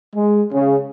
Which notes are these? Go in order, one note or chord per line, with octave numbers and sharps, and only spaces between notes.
G#3
C#3